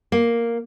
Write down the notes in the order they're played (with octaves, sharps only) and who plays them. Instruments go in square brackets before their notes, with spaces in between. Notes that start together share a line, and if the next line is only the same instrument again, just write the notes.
[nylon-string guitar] A#3